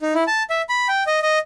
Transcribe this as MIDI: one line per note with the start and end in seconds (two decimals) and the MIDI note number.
0.01 0.14 63
0.15 0.24 64
0.27 0.43 81
0.50 0.62 76
0.69 0.88 83
0.88 1.04 79
1.07 1.19 75
1.22 1.39 75